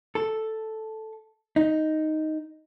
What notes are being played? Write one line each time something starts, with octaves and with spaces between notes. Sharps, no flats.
A4
D#4